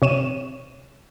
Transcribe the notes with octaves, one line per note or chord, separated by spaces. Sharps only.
C3 C#5 D#7 E7